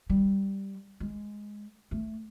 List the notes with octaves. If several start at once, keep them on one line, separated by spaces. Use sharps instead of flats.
G3
G#3
A3